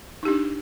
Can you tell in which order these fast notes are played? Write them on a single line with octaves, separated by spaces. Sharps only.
D#4 G4 D4